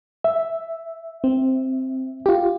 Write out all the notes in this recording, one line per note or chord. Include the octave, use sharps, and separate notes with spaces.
E5
C4
F4 G4